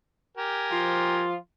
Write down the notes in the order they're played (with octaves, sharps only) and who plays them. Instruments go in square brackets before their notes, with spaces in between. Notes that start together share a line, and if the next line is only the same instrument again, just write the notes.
[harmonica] G4 A#4 G#5
[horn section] F3 F4